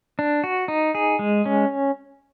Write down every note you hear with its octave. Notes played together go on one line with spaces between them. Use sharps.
D4
F#4
D#4
G#4
G#3
C#4